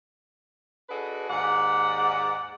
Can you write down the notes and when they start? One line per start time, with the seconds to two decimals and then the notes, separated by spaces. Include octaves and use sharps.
0.89 D4 F#4 G#4 A4 B4 D#5
1.30 D#2 G#2 D5 F#5